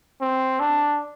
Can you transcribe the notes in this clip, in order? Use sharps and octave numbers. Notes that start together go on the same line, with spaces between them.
C4
D4